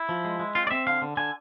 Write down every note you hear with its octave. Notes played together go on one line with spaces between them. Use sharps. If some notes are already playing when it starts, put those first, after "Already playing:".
Already playing: E4
F3
G#3
G#3
C4 F4
D5
C4 E5
D3 F5
D3
D3 G#5